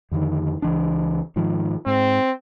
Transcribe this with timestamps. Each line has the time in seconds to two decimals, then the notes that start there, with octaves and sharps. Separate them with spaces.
0.12 F2 D3 D#3
0.62 C#2 E3 D4
1.36 G#2 D#3 F3
1.86 G#2 C4